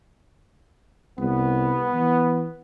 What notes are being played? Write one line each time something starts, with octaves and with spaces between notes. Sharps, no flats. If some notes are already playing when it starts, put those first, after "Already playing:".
C2 B3
E3